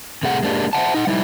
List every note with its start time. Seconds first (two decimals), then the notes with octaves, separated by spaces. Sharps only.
0.23 C3 A3 G#4 F#5
0.43 G#3 A#3 D4 G4
0.73 C5 E5 F#5 A5
0.94 D#4 F#5
1.07 G3 D#4 E4 E5